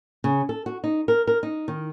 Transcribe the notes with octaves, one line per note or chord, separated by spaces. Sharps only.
C#3
A4
F#4
D#4
A#4
A#4
D#4
D#3